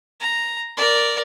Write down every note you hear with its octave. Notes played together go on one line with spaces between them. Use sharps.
A#5
A#4 D5